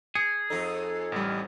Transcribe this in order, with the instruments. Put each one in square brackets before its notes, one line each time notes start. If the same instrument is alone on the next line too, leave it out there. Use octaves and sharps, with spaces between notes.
[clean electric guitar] G#4 [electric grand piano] C#7
[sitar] F2 D#4 [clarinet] A4
[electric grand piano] A1 G3